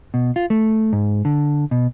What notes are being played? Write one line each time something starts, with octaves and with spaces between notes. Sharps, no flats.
B2
F4
A3
G#2
D3
B2